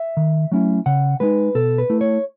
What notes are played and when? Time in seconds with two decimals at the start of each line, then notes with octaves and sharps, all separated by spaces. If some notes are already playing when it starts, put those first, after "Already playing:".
Already playing: E5
0.17 D#3
0.52 F#3 A3 C#4 E4
0.86 C#3 F#5
1.20 G#3 D#4 B4
1.55 B2 A4
1.78 B4
1.90 A3 E4
2.01 C#5